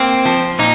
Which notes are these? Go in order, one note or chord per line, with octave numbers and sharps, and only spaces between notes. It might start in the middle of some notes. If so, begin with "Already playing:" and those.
Already playing: A#3 C4
F3
A#2 D#4